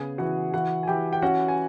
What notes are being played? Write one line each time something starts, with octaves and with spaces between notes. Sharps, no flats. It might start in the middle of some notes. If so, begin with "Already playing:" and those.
Already playing: C#3 B3 G#4 G#5
E3 F#4 F#5
E3 F#4 F#5
G#5
E3 G4 G5
G5
C#4 F#4 F#5
G#5